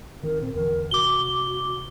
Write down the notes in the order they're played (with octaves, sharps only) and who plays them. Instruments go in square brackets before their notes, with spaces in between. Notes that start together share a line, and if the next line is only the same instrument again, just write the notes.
[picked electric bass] D#3 B3 C4 [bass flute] A#4
[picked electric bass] A#2 [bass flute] C4
[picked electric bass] E2 D3 E3 [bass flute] A#4
[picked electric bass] C3 [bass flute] F#4 [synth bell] D6 G7